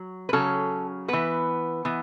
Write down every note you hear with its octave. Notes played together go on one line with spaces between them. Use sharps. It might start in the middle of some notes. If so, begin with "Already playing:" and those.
Already playing: F#3
B4
C#3 F#3 C#4 A4
E3 B3 B4
E3 B3